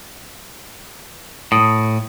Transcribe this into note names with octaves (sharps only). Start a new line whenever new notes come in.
A2 D#6